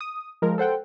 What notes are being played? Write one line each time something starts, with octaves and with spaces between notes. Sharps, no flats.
D#6
F3 G#3 A#4
A4 C5 F#5 G5